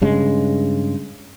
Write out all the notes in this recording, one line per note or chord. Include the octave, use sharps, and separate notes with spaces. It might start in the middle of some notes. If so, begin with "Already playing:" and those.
G2 C#3 G#3